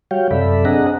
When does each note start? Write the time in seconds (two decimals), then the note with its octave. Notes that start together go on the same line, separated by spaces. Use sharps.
0.11 G3 F#4 C#5 F5 G5
0.31 F#2 C3 A4 D5 E5 B5
0.65 C4 D4 G#4 D#5 F#5 A#5